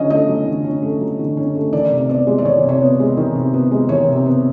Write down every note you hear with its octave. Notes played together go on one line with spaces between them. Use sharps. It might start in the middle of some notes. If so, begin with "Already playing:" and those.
Already playing: D3 F#3 C#4 D#5
A3 D#5
F#3
D3
C#4
A3
F#3
D3
C#4
A3
D#3 D5
C3
B3 D5
G#3
D5
D#3 C#5
C3
C#5
B3
G#3
D#3
C3
B3
G#3
D#3 C#5
C3
B3